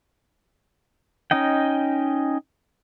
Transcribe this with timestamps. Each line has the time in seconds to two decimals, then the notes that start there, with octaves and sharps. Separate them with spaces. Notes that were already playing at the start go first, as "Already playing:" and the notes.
1.31 C#4 D#4 D#5 G5